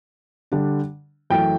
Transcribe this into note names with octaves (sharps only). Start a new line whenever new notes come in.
D3 G3 D4
F#2 E3 A3 G5